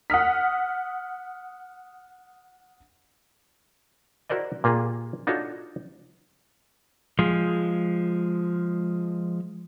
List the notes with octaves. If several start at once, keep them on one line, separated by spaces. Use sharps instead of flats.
F#5 D#6 F6 B6
E4 F#4 A#4 C5 D5 D#5
A#2 A#3 F4 G4 G#4
D4 D#4 F4 F#4 A4 C#5
F3 G#3